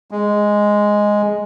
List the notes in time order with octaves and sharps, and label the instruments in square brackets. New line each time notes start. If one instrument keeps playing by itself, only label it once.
[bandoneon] G#3